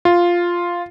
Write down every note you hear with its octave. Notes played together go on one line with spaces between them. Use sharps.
F4